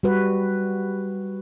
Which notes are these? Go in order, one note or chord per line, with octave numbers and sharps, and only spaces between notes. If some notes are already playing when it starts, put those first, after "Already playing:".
G3 F#4 B4